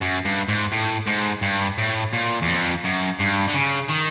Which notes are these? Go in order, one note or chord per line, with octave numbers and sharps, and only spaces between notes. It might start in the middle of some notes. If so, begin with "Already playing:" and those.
F#2
G2
G#2
A2
G#2
G2
A2
A#2
E2
F2
F#2
G2
D3
C#3
D#3